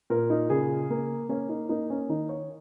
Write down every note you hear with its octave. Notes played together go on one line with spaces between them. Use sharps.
A#2 A#4
D#4
C#3 G#4
A#3
A#3 C#4
D#4
A#3 D#4
C#4
D#3 D#4
C#5